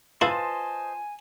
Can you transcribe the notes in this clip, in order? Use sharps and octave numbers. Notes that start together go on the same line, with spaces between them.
E4 F4 B4 C5 D#5 F5 G#5 A5